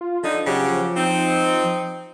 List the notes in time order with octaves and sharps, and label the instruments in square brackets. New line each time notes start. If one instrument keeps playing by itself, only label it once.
[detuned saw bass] F4
[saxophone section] D3 D#4 [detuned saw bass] F3
[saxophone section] C#3 F#3 G4
C4 D#4